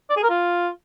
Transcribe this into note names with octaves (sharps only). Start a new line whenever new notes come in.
D5
G#4
A#4
F4